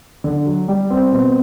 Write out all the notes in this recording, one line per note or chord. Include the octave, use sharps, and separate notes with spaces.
D3
F#3
G3
C4
B2